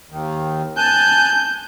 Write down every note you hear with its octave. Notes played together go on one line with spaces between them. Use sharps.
D#2 D#3
G#5 A5 F#6 G6